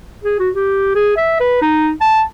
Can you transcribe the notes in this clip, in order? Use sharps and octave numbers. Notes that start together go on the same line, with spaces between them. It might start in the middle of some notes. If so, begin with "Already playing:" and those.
G#4
F#4
G4
G#4
E5
B4
D#4
A5